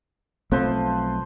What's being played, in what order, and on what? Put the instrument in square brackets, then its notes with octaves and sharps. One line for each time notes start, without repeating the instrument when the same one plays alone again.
[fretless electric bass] B1 A3 C4 [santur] F3 B4 C5